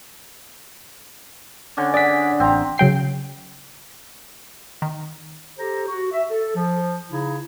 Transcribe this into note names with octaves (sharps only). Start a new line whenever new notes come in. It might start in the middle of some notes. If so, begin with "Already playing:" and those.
D3 C#4 D4
G#4 D5 F#5 B6
A1 C4 A#5
C#3 F#3 G5 C7
D#3
G4 A4 C5 A#5
F#4
E5
A4
F3
C#3 D#4 E4